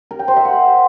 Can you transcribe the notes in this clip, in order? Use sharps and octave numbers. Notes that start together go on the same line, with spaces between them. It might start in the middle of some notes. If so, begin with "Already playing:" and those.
A#4
G5
C5
E5
F#5